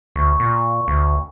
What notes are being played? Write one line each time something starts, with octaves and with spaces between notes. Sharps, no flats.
D2 C#6
A#2
D2